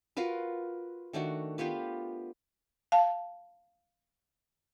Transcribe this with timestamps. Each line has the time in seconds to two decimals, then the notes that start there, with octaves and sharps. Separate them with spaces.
0.17 F4 F#4 A#4 B4
1.13 D#3 A3 D4 F#4
1.58 B3 F4 G4 B4
2.92 F5 A5